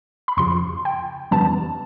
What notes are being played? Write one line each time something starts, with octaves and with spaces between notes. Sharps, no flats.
B5
F2 C#3 F3 C6
G5
F2 C#3 E3 G3 B3 A5